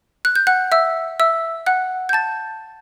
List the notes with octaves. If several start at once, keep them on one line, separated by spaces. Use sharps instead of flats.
F#6
G6
F#5 F#6
E5 E6
E5 E6
F#5 F#6
G6
A5 A6